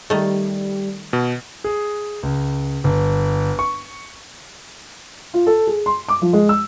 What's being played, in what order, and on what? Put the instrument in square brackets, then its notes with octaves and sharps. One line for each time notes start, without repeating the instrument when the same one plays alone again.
[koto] D#3 A3 [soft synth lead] G3
[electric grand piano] B2
[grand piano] G#4
C#2
G1
C#6
[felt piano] F4
A4
G#4
C6
D6
F3
G#3
E6